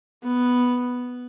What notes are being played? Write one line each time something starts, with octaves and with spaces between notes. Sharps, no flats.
B3